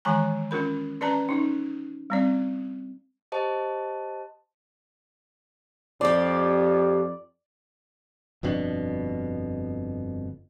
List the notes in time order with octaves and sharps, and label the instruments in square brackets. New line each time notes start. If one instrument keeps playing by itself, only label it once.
[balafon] D#3 E3 G#3 G#5 A#5
C#4 F4 A#4 B5
C#4 B4 D5 A5 A#5
C#4 D#4
G3 C4 D5
[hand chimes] G4 C5 D#5 A5
[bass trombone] F2 [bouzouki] C4 G4 [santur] D5
[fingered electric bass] G1 F2 B2 D4